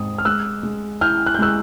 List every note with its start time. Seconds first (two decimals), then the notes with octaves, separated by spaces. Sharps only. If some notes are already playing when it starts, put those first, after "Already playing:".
Already playing: G#2 C4 D#6
0.18 F6
0.25 G#3 E6 F#6
0.63 G#3
1.01 E4 F6 G6
1.26 F#6
1.35 G6
1.39 G#3 E6 F#6